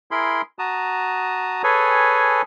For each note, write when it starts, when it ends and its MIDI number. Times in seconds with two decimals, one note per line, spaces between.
0.11 0.42 64
0.11 0.42 68
0.11 0.42 70
0.11 0.42 83
0.11 0.42 84
0.59 1.62 66
0.59 1.62 81
0.59 1.62 82
0.59 1.62 87
1.64 2.42 68
1.64 2.42 69
1.64 2.42 71
1.64 2.42 73
1.64 2.42 80